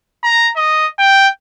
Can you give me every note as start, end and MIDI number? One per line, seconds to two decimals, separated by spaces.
0.24 0.50 82
0.57 0.87 75
0.99 1.28 79